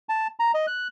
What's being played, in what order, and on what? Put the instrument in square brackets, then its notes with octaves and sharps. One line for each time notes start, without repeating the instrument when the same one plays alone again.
[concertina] A5
A#5
D#5
F#6